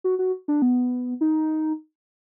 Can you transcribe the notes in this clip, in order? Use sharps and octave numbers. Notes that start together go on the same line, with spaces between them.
F#4
F#4
D4
B3
D#4